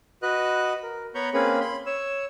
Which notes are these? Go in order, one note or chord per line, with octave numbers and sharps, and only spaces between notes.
F#4 B4 D#5 F#6
A#4
B3 C#5 A#5 B5 C#6 G6
A#3 C4 C#4 G#4 B4 B5
B5 C6
C#5 E6